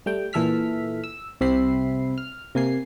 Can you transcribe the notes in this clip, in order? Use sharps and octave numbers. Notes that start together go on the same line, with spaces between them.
G3 A3 G5
A#2 E3 A4 E5 F6 B6
E6
C2 C3 C4 E5 B5 C7
F6
C3 A#3 G#5 C7